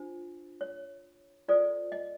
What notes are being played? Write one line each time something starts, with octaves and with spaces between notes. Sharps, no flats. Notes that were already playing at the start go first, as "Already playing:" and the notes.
Already playing: D4 F4 C5
C#5
F4 A4 C5 D5
D#5